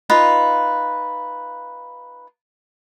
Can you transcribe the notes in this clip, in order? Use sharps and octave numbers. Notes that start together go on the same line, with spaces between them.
D#4 F4 B4 F5